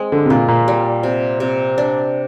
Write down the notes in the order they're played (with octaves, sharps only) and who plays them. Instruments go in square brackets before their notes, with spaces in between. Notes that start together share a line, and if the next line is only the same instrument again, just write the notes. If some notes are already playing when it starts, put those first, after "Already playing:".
Already playing: [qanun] G#3 C4 G#4
[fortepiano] D3
C3
[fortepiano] A#2 [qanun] F4
[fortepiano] A#2
[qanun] G3
C3
C3
D4